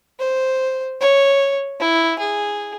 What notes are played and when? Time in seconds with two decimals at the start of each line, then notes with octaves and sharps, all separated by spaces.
0.19 C5
1.01 C#5
1.80 E4
2.19 G#4